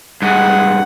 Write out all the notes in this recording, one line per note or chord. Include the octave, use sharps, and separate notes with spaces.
G2 G#3 F#5